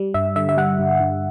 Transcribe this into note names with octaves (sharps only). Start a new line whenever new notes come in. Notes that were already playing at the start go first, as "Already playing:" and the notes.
Already playing: G3
G2 E5
D3 E5
E5
G3 F#5
G2
G2